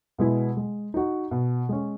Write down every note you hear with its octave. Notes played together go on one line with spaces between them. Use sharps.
B2 G#3 B3 E4
G#3
D#4 F#4
B2
G#3 C#4